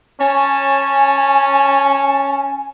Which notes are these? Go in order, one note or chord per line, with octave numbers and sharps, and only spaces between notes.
C#4 G#5 A5